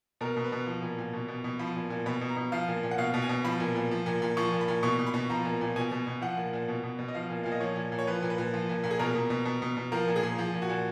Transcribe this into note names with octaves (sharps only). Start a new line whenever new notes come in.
B2 A#4
B2
B4
B2
F3
A#2
A#2
B2
B2
B2
F3 B5
A#2
A#2
B2 B5
B2
A#5
B2
F3 F5
A#2
A#2
F#5
B2 F5
B2
G#5
B2
F3 B5
A#2
A#2
F3
A#2
A#2
F3 C#6
A#2
B5
A#2
B2 C#6
B2
B5
B2
F3 A#5
A#2
A#2
B2 G#5
B2
B2
F3 F#5
A#2
A#2
B2
B2
B2
D#5
F3 F5
A#2
A#2 F5
D#5
F3 C#5
A#2
A#2
C#5
F3 B4
A#2
B4
A#2
F3
A#2
A#2
G#4
B2 A#4
B2
B2
B2
B2
B2
F3 A#4
A#2
G#4
A#2
F3
A#2
F#4
A#2